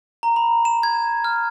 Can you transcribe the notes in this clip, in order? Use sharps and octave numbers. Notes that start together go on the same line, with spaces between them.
A#5
B5
E7
G#6
F6